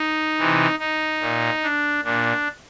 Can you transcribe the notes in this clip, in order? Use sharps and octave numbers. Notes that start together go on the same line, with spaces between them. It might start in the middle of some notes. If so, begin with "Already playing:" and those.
Already playing: D#4
C3 E3
D#4
A#2
D4
A#2 D4